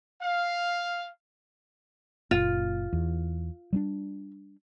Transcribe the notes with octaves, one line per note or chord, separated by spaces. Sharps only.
F5
F#1 A#2 F4
E2
G3 A3 D4